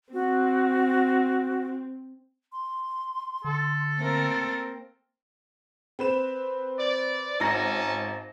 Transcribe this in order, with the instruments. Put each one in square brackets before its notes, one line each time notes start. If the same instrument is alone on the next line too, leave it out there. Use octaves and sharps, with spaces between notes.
[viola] C4 [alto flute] F#4
[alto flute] C6
[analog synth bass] D3 [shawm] A4
[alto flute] A3 [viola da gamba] A#3 C4 A#4
[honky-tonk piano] C4 B4 E7
[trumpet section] D5
[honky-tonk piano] G#1 A#5 A#6 [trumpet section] C#4 A5